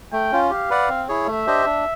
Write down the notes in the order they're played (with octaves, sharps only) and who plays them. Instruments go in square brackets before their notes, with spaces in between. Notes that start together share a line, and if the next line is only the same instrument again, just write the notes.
[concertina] A3 [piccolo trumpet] G5
[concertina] C#4 F4
[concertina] G4 [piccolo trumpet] F5
[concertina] B4 D5 F#5
C4
E4 G#4 C#5
[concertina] A3 [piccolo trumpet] E5
[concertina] D4 G4 C5 D#5
D4